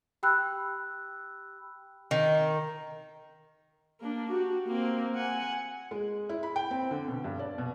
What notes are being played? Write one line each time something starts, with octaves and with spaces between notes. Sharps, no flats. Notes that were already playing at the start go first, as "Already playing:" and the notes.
G4 G5 B5 E6 F#6
D#3
A#3 D4
F#4 G4
A#3 C4
F#5 G#5
G#3
E4
B5
G5
C4
D3
B2
G2
D5
B2